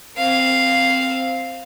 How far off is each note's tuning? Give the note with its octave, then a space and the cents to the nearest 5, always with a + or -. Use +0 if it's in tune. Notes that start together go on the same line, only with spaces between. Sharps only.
C4 +0 F5 +0